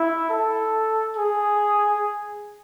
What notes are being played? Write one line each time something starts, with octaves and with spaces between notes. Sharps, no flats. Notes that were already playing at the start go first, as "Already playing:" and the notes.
Already playing: E4
A4
G#4